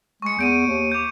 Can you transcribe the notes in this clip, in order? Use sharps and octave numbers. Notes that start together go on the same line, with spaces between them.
G#3 C#6 C#7
E2 G6 D7 D#7
D#2
D6 G6